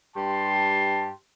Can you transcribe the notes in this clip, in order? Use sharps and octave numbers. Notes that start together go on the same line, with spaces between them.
G2 G4 A5 C6